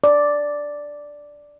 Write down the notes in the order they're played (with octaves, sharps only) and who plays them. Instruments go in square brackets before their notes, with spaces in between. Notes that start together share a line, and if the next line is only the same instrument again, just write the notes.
[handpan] D5